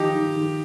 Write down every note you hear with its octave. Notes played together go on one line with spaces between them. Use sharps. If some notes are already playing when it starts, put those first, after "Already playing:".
Already playing: D#3 F3 D#4 G4
D#3
D#3